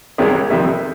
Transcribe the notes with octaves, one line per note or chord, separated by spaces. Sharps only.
C2 C3 D#3 G#3 C#4
F2 C3 D#3 G3 E5